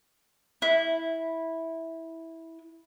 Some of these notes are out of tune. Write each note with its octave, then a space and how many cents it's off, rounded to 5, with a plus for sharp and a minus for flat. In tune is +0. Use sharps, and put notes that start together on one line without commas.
E4 -10